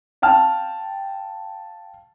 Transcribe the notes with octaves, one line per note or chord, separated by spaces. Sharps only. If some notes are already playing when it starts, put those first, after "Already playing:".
F5 G5 A5 F6